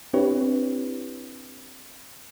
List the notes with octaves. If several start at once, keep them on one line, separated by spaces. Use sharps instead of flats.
C4 D4 E4 G4 B4 C#5